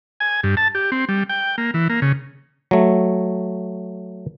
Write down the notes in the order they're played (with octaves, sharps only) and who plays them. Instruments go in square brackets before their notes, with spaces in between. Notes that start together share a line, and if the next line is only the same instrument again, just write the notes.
[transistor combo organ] G#5
G2
A5
G4
C4
G3
G5
A#3
E3
A#3
C#3
[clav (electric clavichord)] F#3 A3